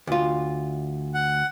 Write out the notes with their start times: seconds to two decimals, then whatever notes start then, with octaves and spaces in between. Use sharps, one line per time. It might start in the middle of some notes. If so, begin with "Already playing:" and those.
0.07 D2 F4
1.14 F#5